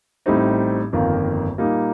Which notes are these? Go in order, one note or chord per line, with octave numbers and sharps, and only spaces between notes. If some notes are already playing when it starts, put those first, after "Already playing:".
A1 A2 G3 C4 D#4
G1 F2 D#3 A#3 F4
A#2 G3 A#3 D#4